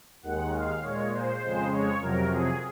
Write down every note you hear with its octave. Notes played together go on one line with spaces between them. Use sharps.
D#2 D#3 G#3 F#5
F5
A#2 G#3 C#5
C5
F2 C#3 G#3
C#5
F2 C3 F#3 A#4
G#4